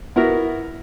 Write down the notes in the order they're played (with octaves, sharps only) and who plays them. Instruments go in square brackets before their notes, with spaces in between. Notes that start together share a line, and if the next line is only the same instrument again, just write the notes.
[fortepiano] B3 E4 F#4 A#4